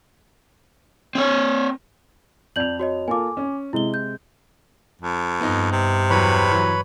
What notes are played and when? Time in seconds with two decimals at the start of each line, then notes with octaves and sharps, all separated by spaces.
1.15 C4 C#5
2.56 F2 D5 G6 F7 F#7
2.79 F#4 C#5 D#5
3.08 A#3 F4 A4 G#5 D6
3.37 C#4
3.73 C3 G#3 E4 G7
3.94 G6
5.02 F2
5.41 G2 B3 D#4
5.72 C3
6.10 E2 F#3 B4 C#5 B5
6.52 E3 F#3